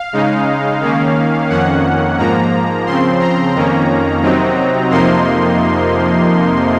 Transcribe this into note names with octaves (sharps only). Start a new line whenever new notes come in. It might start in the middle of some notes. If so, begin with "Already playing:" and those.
Already playing: F5
C#3 G#3 D#4
D#3 A#3 C#4
F2 D#3 A#3 C#4 F#5
G#2 F3 A#3 A#5
C#3 F3 C4 C6
A#5
F2 D#3 A#3 C#4
C3 F#3 C4 D#4
F2 C3 F3 A#3 D#4 C6